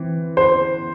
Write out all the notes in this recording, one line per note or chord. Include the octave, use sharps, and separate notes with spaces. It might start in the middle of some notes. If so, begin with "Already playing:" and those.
Already playing: E3 C4
C5